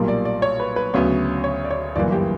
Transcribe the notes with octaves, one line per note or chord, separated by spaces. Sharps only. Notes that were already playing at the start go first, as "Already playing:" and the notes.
Already playing: B1 A#2 G3 A#3
D5
D5
C#5
B4
B4
D2 C#3 F#3 B3 C#5
C#5
D5
C#5
G1 F#2 E3 A#3 D5
G4